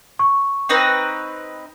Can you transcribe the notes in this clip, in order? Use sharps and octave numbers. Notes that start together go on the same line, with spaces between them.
C#6
C4 D#4 B4